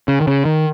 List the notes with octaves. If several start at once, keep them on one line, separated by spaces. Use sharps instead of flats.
C#3
D#3
C#3
D#3